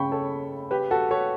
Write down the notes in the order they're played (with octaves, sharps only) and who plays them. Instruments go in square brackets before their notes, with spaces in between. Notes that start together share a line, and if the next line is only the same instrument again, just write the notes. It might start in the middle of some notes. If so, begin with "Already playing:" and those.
Already playing: [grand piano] C#3 [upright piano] G5 B5 C#6
[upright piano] A4 C#5
G4 B4
F#4 A4
A4 C#5